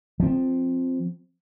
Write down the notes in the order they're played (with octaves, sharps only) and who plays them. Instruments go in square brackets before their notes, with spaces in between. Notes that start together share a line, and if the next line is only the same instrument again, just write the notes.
[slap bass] F3 C4